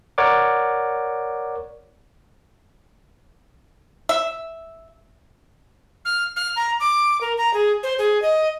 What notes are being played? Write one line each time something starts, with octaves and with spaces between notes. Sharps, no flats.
A#4 C#5 D5 F#5 D6
E5
F6
F6
A#5
D6
A#4
A#5
G#4
C5
G#4
D#5